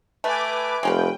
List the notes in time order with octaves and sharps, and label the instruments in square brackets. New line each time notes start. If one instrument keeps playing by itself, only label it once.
[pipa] A3 [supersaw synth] B4 G#5 D6
[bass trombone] F1 [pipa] G#3 C#4 B4 [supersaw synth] G5